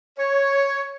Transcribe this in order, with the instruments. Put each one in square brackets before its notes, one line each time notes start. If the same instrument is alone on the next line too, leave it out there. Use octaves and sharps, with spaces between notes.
[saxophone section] C#5